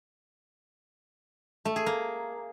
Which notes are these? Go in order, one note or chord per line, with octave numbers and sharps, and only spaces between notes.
A3
G#4
A#3